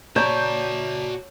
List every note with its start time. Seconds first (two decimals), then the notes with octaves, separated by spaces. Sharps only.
0.16 A#2 F#4 C#5 D5 A5 A#5 G6